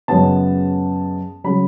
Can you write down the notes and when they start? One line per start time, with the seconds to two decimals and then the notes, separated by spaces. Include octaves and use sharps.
0.08 F#2 C#3 G#3 B3 A5
1.44 C#3 F#3 B5